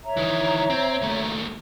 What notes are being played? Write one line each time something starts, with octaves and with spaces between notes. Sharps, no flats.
C#5 E5 A#5
D#3 E3
C4
D#2 A3